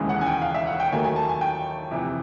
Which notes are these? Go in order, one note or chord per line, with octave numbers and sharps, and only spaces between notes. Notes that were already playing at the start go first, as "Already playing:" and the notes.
Already playing: E1 D#2 C#3 E3 G#3
F#5
G#5
G5
F5
E5
F#5
G5
D#2 D#3 F#3 A3 G#5
G#5
A5
G#5
G5
F2 C3 E3